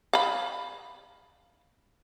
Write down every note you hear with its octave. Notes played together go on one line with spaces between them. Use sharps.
F5 B5